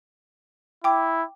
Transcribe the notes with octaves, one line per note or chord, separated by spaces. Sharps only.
E4 G5 D6